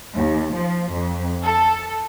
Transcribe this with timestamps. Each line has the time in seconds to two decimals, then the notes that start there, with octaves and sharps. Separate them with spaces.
0.16 D#2
0.55 F3
0.92 F2
1.44 A4